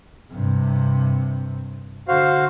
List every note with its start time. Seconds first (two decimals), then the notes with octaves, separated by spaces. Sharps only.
0.31 G2 C3
2.08 D3 F#4 C5 F5